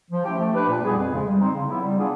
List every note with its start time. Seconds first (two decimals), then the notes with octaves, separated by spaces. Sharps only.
0.11 F3
0.25 A3 C#4 E4 G4
0.39 A3
0.53 D4 G4 B4
0.68 A#2
0.82 G3 B3 D#4 G#4
0.96 F2
1.10 C#3 F3 G#3
1.25 G3
1.39 C4 D#4
1.53 C#3
1.67 F#3 B3 E4
1.81 G3
1.96 B3 D4 F4 G#4